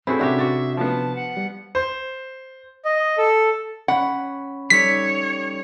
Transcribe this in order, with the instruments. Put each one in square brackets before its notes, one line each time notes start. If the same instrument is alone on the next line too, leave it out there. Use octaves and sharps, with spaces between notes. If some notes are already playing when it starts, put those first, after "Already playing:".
[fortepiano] C4 G#4 A4 [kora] E4 F#4 B4
[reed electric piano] C3 D4 [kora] C#4 F#4 G4 [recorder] E5
[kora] F#4 D5
[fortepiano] F3 B3 [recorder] A5
[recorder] F#5
[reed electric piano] G3
[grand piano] C5
[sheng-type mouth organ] D#5
A4
[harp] C#4 B5 [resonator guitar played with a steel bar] F#5
[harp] G3 D#4 A4 [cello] C#5 [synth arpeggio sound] B6